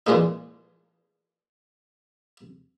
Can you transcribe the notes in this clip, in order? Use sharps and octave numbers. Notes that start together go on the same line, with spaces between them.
A#2 E3 F3 G#3 A#3 D#4